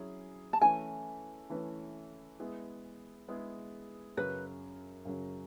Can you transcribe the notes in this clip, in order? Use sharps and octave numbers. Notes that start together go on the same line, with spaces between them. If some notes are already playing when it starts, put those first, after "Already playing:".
Already playing: F#3 C#4 E4 G#4
A5
E3 A3 C#4 E4 B4 G#5
E3 A3 C#4 E4 B4
G#3 B3 E4 G#4
G#3 B3 E4 G#4
F#2 C#3 F#3 B4
F#2 C#3 F#3